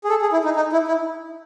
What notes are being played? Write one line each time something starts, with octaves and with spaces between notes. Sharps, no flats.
G#4
A4
G#4
E4
D#4
D#4
E4
E4